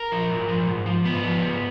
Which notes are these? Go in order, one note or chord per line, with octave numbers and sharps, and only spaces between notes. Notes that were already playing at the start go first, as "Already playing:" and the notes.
Already playing: A#4
F3
G#2
F3
G#2
F3
G#2 B3
F3
G#2